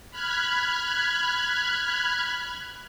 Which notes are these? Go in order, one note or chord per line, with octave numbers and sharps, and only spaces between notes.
B5 F6 F#6 G#6